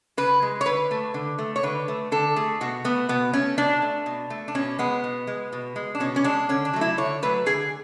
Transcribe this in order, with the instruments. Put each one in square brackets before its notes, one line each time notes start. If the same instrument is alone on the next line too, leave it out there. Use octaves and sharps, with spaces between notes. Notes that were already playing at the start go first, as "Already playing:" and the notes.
[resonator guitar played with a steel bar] C#3 B4
G#3
C#5
D3 B4
A3
D3
A3
C#5
D3 B4
A3
D3 A4
A3 G#4
B2 F#4
A3 B3
B2 B3
A3 C#4
B2 D4
A3
B2
A3
D4
B2 C#4
G#3 B3
B2
G#3
B2
G#3
D4
B2 C#4
C#4
G#3 D4
D3 C#4
D4
F#3 A3
E4
D3 C#5
F#3 A3 B4
D3 G#4